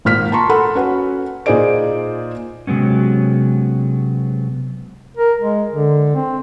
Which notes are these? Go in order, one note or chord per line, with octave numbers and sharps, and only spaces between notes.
G#1 A#2 F6 B6
A5 A#5 C6 C#6
A4 F#5 B5 C6
C#4 F#4 B4 F#5
A#2 D#4 G#4 C5 D5 D7
C3 F#3 G#3 B3 C#4
A#4
G#3
D3
C4